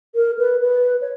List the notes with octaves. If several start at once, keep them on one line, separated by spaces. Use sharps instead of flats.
A#4
B4
B4
C#5